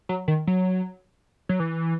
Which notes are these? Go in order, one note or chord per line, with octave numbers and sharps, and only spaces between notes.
F#3
D#3
F#3
F#3
E3